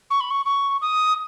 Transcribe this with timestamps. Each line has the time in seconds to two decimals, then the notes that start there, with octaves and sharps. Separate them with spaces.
0.10 C#6
0.20 B5
0.30 C#6
0.45 C#6
0.81 D#6